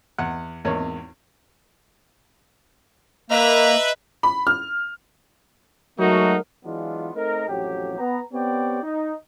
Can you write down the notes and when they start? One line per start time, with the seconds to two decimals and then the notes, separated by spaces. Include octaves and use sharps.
0.18 E2 F#5
0.65 G#1 E2 A#3 C#5
3.30 A#3 B4 D#5 E5 A#5
4.23 B5
4.47 F6
5.98 F#3 G#3 A3 D#4 F#4 A#4
6.65 E3 F#3 G#3 B3 D4 F4
7.15 A3 C4 D#4 A#4
7.48 A1 F2 F#3 G4
7.98 B3 A#5
8.33 B3 C4 G4 C#5 D5 G5
8.83 D#4